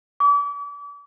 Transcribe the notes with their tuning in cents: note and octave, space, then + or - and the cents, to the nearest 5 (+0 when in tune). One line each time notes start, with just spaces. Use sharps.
D6 -40